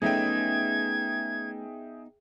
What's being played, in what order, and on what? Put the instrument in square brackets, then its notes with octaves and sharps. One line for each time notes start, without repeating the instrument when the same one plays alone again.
[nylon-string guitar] A3 C#4 [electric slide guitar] B3 D#4 [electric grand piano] G#4 E5 G5 [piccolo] G#6